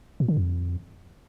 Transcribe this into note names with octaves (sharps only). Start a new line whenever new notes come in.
A#2
D3
F2